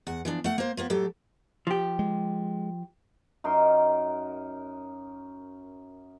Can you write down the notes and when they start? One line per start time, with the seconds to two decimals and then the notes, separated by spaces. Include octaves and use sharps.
0.07 E2 F#5
0.25 E3 F3 D4
0.44 A3 F#5
0.58 A#3 C5
0.77 F3 A#3 B3
0.90 A2 F#3 G4 A4
1.67 F3 G4
1.99 G#3
3.44 F#2 D#4 A#4 C6